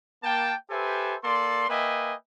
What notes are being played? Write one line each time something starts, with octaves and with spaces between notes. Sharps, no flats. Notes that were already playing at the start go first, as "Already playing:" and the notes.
A#3 G5 A5
G4 A4 B4 C5 E5 G#5
A#3 A4 D5 C6
A#3 B4 D#5 E5 G5 G#5